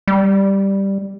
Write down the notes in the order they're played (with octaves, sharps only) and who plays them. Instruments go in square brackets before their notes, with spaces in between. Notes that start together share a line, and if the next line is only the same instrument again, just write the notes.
[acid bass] G3